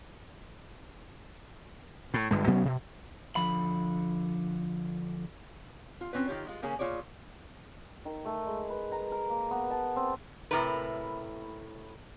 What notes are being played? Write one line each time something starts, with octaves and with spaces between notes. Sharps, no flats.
A2
G1 G2 G#3
B2 F#3 B3 C#4
B2
D3 F3 B5
F4
C4 C#4 F4 B4
D#3 F4 G4 C#5
G#3 F4
C#3 A#3 C#4 G#4
A#2 G#3 F4 G#4 C#5 D5
D#3
A3
G#3
B4
A#5
A#4
A#3
B3
A5
C4
A2 C3 E4 A#4 B4